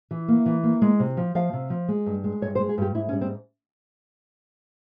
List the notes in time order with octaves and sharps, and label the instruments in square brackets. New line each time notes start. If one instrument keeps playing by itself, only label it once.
[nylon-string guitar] E3
A#3
E3
A#3
G#3
C3
F3
F3 F5
C3
F3
G#3
G2
G#3
G2 C#5
C5
G#3
G#4
G2 G4
G#2 E4
C#4
G3
C4